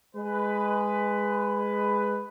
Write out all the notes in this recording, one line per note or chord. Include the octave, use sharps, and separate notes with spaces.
G#3 B4